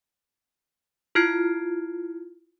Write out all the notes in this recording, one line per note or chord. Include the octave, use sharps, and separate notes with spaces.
E4 F4 F6 G#6 C7 D7